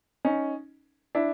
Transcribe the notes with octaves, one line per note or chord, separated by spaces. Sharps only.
C#4 D#4
D4 E4